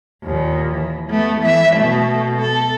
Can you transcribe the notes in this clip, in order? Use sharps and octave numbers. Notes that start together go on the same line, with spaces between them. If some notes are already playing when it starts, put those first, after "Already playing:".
D#2 A#2
E3
A3 B3
E3 E5
B2 A3
A4